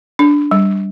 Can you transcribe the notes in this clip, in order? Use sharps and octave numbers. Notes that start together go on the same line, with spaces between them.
D4
G3